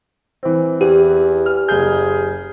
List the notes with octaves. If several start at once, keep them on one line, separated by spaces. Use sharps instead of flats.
E3 C4
E2 G4
F6
F#1 G#4 G6